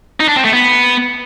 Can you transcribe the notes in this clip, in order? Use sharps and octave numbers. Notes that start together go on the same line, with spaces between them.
D#4
D4
C4
A3
B3